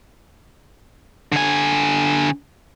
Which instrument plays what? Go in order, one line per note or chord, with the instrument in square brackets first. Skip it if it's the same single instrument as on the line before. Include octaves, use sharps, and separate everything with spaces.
[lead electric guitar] D3 G#5